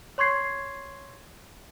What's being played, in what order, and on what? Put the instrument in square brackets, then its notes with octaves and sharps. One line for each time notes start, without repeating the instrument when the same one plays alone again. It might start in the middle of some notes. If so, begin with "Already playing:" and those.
[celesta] C#5 C6 C#6 G#6 C7